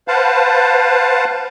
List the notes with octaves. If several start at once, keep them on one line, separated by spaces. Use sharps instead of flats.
B4 C5 F5 F#5 A5